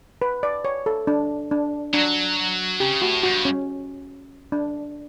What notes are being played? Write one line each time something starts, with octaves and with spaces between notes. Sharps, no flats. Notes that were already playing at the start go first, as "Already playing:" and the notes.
B4
D5
C#5
A4
D4
D4
F#3 D4
C#3 G4
A2 F#4
G2 F#4
C#4
D4